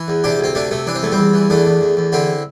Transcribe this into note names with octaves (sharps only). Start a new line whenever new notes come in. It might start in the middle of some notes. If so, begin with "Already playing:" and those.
Already playing: E3
E2
C3 D4 G4
D2 C4
C3 A3 D4
C3 A3
E3 D4
C4
E2 A3
G3 C4
E2
E3
E2 A3 D4
E2
E2
E2
D3 C4 E4